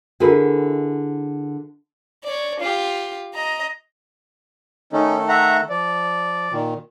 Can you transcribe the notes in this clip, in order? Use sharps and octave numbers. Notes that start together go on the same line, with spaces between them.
D3 E4 F#4 G#4 A#4 B4
C#5 D5
F4 G4
D#5 A#5
D#3 A3 C#4 D#4 A4
E5 F#5 A#5
F3 D5
A#2 D#3